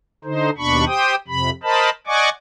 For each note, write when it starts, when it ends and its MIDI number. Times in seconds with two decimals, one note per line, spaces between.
0.25 0.50 50
0.25 0.50 63
0.25 0.50 72
0.58 0.85 39
0.58 0.85 47
0.58 0.85 62
0.58 0.85 83
0.58 0.85 85
0.87 1.15 67
0.87 1.15 72
0.87 1.15 79
0.87 1.15 87
1.28 1.50 41
1.28 1.50 48
1.28 1.50 83
1.63 1.90 70
1.63 1.90 72
1.63 1.90 75
1.63 1.90 81
1.63 1.90 83
2.07 2.29 74
2.07 2.29 75
2.07 2.29 78
2.07 2.29 80
2.07 2.29 85
2.07 2.29 86